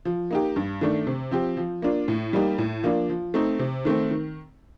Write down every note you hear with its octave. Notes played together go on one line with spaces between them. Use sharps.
F3
A#3 D#4 G4
G2
D#3 A3 D4
C3
F3 C4 G4
F3
A#3 D4 F4
A2
G3 A#3 D#4 G4
A2
F3 A#3 D4
F3
A3 C4 D#4
C3
D#3 A3 C4
D#3